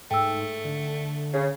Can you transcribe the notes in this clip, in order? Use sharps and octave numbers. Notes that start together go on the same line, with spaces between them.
G#2 A3 G5 E6
D3
C#3